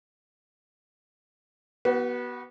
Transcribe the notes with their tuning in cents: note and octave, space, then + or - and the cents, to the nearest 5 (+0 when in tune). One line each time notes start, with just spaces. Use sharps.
B3 -20 F#4 +35